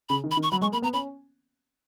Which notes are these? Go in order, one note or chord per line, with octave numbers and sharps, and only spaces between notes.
C#3 B5
D#3
B5
D#3
C#6
F#3 B5
G#3 C#6
A#3 B5
B3 A#5
C#4 B5